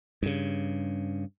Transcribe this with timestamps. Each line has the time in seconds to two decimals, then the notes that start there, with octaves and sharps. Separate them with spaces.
0.23 G2 C#3